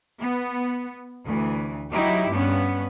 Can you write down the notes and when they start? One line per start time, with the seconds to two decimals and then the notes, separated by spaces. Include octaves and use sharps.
0.20 B3
1.25 D2 E3
1.92 F#3 D#4 E4 G4
2.30 G2 B3 C#4